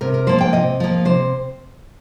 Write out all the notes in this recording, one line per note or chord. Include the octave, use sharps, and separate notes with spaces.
C3 A#4
A#4
F3 A#3 C5
G5
C3 D#5
F3 A#3
C3 C5